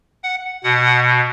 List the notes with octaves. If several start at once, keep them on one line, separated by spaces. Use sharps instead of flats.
F#5
B2 F#5